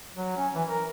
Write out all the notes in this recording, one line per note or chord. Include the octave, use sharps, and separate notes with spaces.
F#3
C#4
E3
A#4